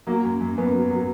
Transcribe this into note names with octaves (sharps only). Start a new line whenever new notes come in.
F#3 A#3
F#2
F#2
F#2 B3
F#3
F#3